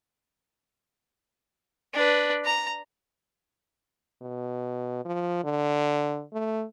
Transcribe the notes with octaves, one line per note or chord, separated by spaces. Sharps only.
D4 B4
A#5
B2
F3
D3
A3